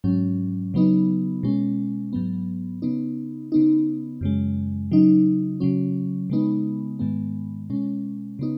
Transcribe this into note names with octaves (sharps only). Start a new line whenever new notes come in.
G#2 F#3 C#4
C#3 F#3 B3 D#4
B2 G#3 C#4
G#2 F#3 B3
C#3 B3 D#4
C#3 B3 D#4
F#2 C#3 G#3
C#3 F#3 D#4
C#3 F#3 C#4
C#3 G#3 B3 D#4
G#2 D#3 G#3 B3
B2 G#3 C#4
C#3 B3 D#4